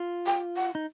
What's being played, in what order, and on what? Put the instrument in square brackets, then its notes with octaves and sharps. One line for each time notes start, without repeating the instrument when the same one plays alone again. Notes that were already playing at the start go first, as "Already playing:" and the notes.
Already playing: [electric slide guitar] F4
[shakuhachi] G5
F#5
[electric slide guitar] D#4